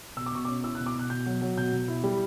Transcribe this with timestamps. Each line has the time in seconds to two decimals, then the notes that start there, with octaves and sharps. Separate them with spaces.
0.16 B2 E6
0.26 D6
0.32 B2 C#6
0.45 C#4 D6
0.64 E4 E6
0.75 F#6
0.80 B2
0.86 D6
0.95 B2 F#6
1.10 B2 G6
1.26 F#3
1.42 F#3
1.58 B2 G6
1.72 B2
1.88 E4
2.04 G3